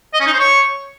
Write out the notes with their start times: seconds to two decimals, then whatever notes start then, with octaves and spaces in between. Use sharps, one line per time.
0.14 D#5
0.20 C#4
0.27 D#4
0.33 C5
0.39 C#5